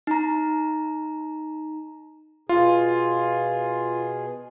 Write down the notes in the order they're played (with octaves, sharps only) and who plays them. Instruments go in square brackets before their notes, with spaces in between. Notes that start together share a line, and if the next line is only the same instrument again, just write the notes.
[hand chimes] D#4 A#5
[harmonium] B2 G#4 [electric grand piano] F4